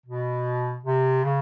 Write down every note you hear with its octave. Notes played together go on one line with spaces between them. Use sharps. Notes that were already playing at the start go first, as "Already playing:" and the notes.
B2
C3
C#3